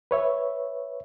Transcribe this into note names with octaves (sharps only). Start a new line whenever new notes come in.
B4 C#5 E5